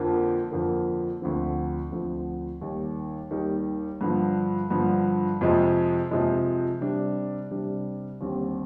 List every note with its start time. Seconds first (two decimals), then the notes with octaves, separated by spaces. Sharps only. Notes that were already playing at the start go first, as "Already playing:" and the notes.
Already playing: F2 D3 F3 A#3
0.51 F2 D3 F3 A#3
1.21 D2 D3 F3 C4
1.91 D2 D3 F3 C4
2.61 D#2 D#3 G3
3.31 D#2 D#3 G3
4.01 G2 D3 F3
4.70 G2 D3 F3
5.41 F2 C3 F3 G#3
6.11 F2 C3 F3 G#3
6.81 C3 G3 D4
7.51 C3 G3 D4
8.21 D#2 D3 G3 C4